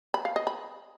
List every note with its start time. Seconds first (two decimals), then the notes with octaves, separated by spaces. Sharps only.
0.14 B5
0.25 F5
0.36 D#5
0.47 B5